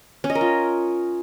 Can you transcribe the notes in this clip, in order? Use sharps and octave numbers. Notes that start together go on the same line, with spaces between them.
C#4
D#5
A#4
F4